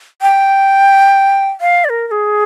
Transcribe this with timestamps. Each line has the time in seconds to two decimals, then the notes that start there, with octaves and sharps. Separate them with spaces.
0.22 G5
1.61 F5
1.84 D5
1.89 A#4
2.08 A#4
2.11 G#4